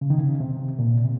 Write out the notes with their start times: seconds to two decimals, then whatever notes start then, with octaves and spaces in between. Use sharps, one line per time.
0.01 C#3
0.10 D#3
0.18 C#3
0.40 C3
0.79 A#2
1.04 C3